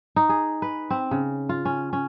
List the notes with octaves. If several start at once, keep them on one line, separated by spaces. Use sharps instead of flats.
D#4
G#4
B4
C4
C#3
F4
C#4
C#4